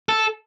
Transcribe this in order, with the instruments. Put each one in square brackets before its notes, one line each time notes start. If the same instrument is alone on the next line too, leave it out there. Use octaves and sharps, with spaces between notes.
[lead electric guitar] A4